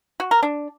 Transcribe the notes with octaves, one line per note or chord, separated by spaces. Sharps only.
F#4
A#4
D4